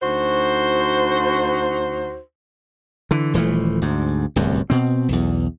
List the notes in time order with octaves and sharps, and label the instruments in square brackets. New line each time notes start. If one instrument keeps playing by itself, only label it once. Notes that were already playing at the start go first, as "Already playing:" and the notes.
[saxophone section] D2 D#4 F#4 C5
[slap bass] D3 E3
D#1 E3 F3 A3
D2 G#2
D1 C2 F#2
B2 C4
B1 E2